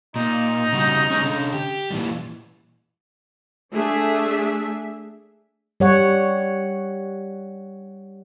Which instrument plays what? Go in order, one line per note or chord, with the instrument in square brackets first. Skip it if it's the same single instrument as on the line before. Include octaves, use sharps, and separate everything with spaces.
[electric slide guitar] A#2 [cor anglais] D#4
[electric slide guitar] C#3 G3 F#4
G#3 C#4
D3 C#4
G4
A#2 E3 G3
[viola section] A3 D4 G#4 E5
[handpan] G3 C#5 F#5